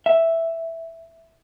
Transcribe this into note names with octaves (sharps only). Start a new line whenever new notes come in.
E5